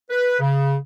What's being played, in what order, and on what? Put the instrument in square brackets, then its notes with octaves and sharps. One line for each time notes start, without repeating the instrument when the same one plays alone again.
[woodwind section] B4
C#3